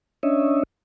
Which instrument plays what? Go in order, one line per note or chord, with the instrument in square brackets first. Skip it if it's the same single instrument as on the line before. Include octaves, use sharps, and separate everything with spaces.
[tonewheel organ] C#4 D4 C#5 D#5 E5